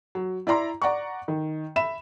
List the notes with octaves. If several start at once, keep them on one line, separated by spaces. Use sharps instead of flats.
F#3
E4 D5 A#5 C6
D5 F#5 A#5 C#6
D#3
E5 B5 E7